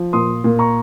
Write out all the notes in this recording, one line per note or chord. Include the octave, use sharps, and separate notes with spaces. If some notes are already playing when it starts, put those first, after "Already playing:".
Already playing: F3
A#2 C6 D#6
A#2
A#5 C#6